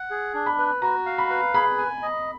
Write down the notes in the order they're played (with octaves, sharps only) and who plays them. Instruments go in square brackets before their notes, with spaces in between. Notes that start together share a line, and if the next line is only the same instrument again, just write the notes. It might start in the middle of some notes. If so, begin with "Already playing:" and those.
Already playing: [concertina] F#5
G#4
D4
[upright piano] B5
[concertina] B4
[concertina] F#4 [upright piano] A#5
[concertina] F5
[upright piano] B5
[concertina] B4
[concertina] G#4 [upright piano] B5
[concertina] G#5
D#5